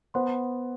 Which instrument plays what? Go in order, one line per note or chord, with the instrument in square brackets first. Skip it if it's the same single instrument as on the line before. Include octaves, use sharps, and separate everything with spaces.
[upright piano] B3 [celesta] C5 F#5 C6